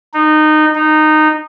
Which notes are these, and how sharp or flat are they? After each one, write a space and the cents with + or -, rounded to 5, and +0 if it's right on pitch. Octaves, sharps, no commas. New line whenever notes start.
D#4 -20
D#4 -15